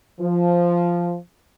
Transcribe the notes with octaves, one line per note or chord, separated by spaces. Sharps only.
F3